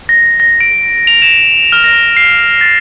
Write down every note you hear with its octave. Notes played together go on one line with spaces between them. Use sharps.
A#6
A#6
D7
F7
E7
F6
A#6
C7
A6